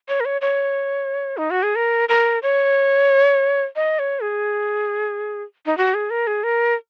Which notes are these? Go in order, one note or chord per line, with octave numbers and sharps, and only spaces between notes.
C#5
A#4
C#5
C#5
D#4
F#4
G#4
A#4
A#4
C#5
D#5
C#5
G#4
D#4
F#4
G#4
A#4
G#4
A#4